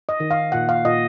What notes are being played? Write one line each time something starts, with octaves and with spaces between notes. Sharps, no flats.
D#5
D#3
F5
A#2 F#5
F5
A#2 D#5